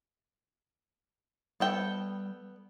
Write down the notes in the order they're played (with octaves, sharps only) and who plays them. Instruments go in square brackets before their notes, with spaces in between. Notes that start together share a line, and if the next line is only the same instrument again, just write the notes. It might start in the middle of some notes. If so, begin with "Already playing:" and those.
[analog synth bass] G3 [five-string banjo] B3 A4 G5